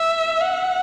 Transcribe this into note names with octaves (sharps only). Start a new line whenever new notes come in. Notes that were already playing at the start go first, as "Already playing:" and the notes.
Already playing: E5
F#5